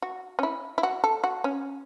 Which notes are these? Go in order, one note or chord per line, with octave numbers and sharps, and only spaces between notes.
F#4
C#4
E4
E4
F#4
A4
F#4
C#4